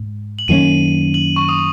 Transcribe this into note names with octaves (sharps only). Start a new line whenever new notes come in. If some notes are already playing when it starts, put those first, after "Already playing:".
Already playing: G#2
F#7
F#2 D#3 A#3 C#4 D#7
F#7
C#6
D#6